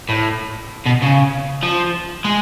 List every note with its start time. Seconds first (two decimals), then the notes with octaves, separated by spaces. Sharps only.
0.09 A2
0.86 B2
1.02 C#3
1.63 F3
2.25 G#3